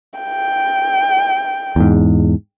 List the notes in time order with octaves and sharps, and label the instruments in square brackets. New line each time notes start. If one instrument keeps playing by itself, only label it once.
[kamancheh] G5
[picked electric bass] E2 G#2